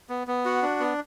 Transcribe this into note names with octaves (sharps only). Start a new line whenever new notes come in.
B3
B3
F#4
D4
B3